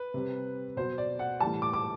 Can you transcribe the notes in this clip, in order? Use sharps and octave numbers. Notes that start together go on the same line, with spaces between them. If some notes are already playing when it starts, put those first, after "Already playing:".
Already playing: B4
C3 G3
B2 F#3 C5
D5
F#5
A2 E3 G3 A5
D6
D6